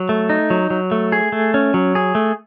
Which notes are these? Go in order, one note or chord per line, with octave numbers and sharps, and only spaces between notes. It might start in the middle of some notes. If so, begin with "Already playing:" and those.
Already playing: F#3
A3
D#4
F#3
F#3
A3
G#4
A3
C#4
F#3
G#4
A3